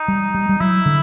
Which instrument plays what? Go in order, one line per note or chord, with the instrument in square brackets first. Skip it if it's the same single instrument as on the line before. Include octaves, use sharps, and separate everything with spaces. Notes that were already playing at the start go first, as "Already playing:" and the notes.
Already playing: [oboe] D#4
[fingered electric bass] G3
G3
G3
[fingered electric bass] F#3 [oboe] E4
[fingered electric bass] D3